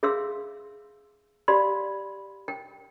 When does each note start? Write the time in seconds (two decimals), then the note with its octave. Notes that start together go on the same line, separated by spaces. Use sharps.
0.03 G#4 E5 F5 C6 E6
1.48 G4 D5 F5 B5 C6
2.48 G5